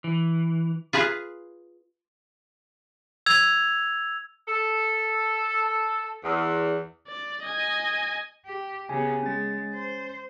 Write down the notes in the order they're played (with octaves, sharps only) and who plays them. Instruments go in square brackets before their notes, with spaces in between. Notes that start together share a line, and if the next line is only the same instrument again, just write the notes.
[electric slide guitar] E3
[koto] F4 G#4 B4 F5
[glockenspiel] E6 G#6 F7
[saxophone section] A4
E2
[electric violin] D5
D#5 G#5
[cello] G4
[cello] C#3 B3 [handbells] G4 G#5
[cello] G#3 [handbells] C#4 A6
[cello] C5